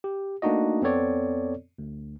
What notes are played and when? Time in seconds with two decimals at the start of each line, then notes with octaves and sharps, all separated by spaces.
0.04 G4
0.42 A3 A#3 D4 D#4 F#4 D#5
0.82 F2 B3 C4 A4 C#5 D5
1.79 D2